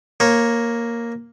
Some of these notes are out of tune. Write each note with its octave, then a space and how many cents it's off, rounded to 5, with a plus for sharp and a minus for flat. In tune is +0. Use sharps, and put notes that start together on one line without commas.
A#3 +0 C#5 -15